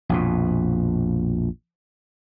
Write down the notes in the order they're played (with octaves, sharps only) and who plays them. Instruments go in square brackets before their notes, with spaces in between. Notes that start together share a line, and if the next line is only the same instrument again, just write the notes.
[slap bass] A#1 F2 B2